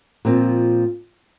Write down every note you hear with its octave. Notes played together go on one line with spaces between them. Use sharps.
A#2 F3 C4